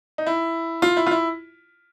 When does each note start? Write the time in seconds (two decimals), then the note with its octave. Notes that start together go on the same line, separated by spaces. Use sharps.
0.18 D#4
0.26 E4
0.82 F4
0.97 E4
1.07 F4
1.11 E4